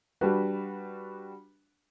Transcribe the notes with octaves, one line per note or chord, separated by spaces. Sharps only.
G3 D4 F#4 B4